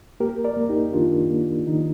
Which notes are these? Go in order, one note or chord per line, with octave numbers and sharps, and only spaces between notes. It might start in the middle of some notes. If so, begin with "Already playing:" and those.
A#3 G4 A#4
A#4 D5
A#3
D#4 G4
D#3 D4 F4
A#3
D#3 D#4